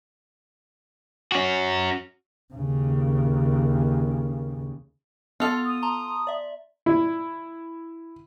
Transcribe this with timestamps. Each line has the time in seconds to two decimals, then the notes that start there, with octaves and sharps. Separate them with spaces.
1.32 C#4 F#4
2.54 D#2 C#3
5.40 B3 F4 A4 F7
5.65 D#6
5.83 A5 A#5 C6
6.27 D5 E5
6.86 E4